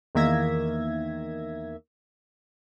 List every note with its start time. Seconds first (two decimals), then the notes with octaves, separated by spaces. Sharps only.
0.15 E2 D#3 A#3 E5 G#6 A#6